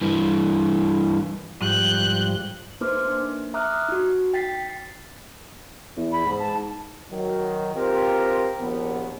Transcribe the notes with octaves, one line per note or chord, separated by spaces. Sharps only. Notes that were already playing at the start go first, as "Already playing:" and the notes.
G2 E3
G#2 F3 G3 F#6 G6
A#3 D#4 B4 C5 D6 F6
A#3 D4
E5 A#5 D6 D#6 F6 F#6
D#4 F#4
G5 A6 B6 C7
E2
B5
G#2
A5
D#3 F#3
C4 F4 G4 A#4
A#1 D#2 B3